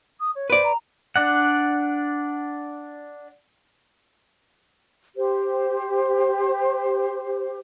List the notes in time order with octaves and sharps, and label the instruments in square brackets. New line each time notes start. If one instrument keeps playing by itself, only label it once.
[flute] D#6
C#5
[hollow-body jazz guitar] B4 D5 [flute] C5
[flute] A#5
[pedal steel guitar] D4 D5 F#5
[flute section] G4 C5